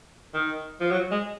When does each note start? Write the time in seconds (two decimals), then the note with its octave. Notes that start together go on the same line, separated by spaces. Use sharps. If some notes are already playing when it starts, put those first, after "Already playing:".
0.34 D#3
0.81 F3
0.91 F#3
1.11 G#3